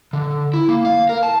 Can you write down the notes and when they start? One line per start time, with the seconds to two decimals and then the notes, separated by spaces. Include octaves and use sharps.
0.13 D3
0.54 E4
0.68 A#3
0.85 F5
1.09 A#4
1.23 A5